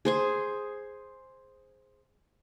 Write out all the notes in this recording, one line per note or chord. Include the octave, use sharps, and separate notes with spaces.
G#4 C5 G#5